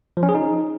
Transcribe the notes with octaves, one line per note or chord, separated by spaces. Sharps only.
F3
C#4
G#4
D#4